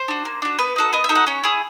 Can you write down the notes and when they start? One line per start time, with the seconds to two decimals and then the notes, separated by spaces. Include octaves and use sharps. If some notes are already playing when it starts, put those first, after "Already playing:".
Already playing: C5
0.08 D4 F#4
0.25 A#3
0.42 D4 F#4
0.59 B3 B4
0.76 D#4 F#4 A4
0.93 B3 D#5
1.04 E5
1.09 D#4 F#4 A4
1.15 F#5
1.27 C#4 C#5
1.44 E4 G#4